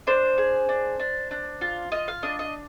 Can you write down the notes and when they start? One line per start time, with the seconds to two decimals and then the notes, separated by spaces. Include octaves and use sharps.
0.07 D4 C5
0.38 G#4
0.69 D4
1.00 D4
1.31 D4
1.61 F4
1.92 F4 D#5
2.08 F5
2.23 D4 D#5
2.39 D#5